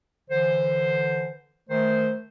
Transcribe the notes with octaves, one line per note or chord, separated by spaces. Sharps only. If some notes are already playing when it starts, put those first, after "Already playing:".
D3 E3 C5
D#3 A3 C5